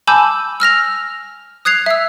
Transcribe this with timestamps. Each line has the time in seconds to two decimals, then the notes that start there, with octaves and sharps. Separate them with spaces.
0.07 G#5 A5 B5 D6 E6 G6
0.60 E6 F6 A#6 F7
1.65 D#6 F#6 G#6 C7 F7
1.86 E5 E6